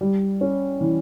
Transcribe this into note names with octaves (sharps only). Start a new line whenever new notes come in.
G3
C#4
E3